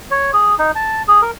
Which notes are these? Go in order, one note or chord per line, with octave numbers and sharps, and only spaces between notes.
C#5
G#4
D#4
A5
G#4
A#4